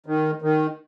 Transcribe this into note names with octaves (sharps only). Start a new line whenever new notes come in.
D#3
D#3